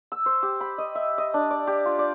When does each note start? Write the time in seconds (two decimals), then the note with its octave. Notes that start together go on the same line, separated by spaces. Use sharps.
0.12 E6
0.26 C5
0.43 G4
0.61 B5
0.78 D#5
0.95 E5
1.18 D#5
1.34 D4
1.51 D5
1.67 G4
1.86 F4
1.99 D5